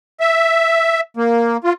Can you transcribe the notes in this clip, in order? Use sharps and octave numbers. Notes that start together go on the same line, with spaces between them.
E5
A#3
F4